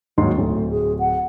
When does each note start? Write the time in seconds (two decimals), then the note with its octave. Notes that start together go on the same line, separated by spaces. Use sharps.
0.18 D#2 G#2 F#3 C6
0.38 D1 A3
0.70 G#4
0.99 F#5